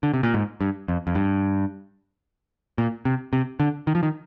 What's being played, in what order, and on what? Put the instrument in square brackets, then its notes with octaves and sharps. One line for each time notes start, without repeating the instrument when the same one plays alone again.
[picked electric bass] D3
C3
A#2
G#2
G2
F2
F2
G2
A#2
C3
C3
D3
D#3
F3
D#3